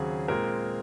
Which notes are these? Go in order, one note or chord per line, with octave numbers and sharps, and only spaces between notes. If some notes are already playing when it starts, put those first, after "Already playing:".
Already playing: D#2 C#3 F#3 C4 G#4
A#2 G#3 C4 A#4